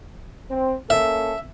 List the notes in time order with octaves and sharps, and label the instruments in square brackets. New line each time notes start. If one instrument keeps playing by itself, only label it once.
[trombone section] C4
[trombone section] A#3 C#4 A4 [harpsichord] E5